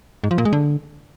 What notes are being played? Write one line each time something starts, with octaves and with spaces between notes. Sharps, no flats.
G#2
F3
A#2
G#3
D3